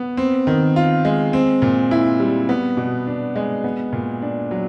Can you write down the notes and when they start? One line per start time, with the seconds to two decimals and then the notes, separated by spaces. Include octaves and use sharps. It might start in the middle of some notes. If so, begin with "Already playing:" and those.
Already playing: B3
0.17 C4
0.47 D#3
0.76 F4
1.05 G#3
1.33 C4
1.62 A#2
1.91 E4
2.20 G3
2.49 B3
2.77 B2
3.07 D4
3.36 G#3
3.64 B3
3.93 A#2
4.22 D4
4.51 F#3